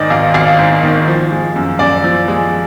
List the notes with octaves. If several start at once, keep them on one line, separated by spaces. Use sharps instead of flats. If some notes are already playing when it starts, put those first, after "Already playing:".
Already playing: G#2 D#3 D5 D#5
G#1 F5
G#1 F5
G#2
D#3
F3
G#3
F#2
F#2 D5
F3
G#3